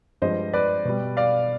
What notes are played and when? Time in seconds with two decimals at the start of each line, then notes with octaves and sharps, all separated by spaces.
0.22 G2 F3 G#3 C5 D#5
0.53 B4 D5
0.85 B2 G3
1.17 D5 F5